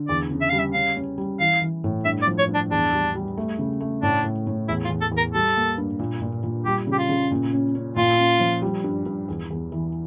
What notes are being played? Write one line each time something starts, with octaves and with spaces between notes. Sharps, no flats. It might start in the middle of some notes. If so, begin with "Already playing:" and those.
Already playing: D3
E2 D5
C#3
E5
G3 F5
E5
C#4 F5
C#4
G3
E3 F5
E3
A2
G2 E5
D5
F3
C#5
G2
D4
E2 D4
G3
G3
A3
C#3
A3
A2 D4
A2
A2
E2 E4
F4
E2
A4
E2
A#4
G3 A4
A#3
G2
A#2
A#2
A#2
G3 G4
C#3
G4
F4
C#3
A#2
C#4
C#4
A#2 F4
C#4
F3
G3
G2
G2
E2
E2
E3